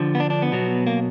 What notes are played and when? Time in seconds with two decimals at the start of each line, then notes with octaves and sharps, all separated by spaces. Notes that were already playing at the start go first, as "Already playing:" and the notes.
Already playing: D3 F3
0.15 B3
0.20 D4
0.30 D4
0.42 B3
0.52 B2 F#3
0.87 A#3